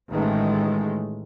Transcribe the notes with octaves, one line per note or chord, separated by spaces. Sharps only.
A1 D#3 G#3 A3